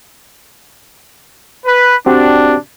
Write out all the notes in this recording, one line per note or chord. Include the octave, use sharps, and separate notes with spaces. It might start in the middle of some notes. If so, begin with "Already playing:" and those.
B4
C4 D4 F#4 G4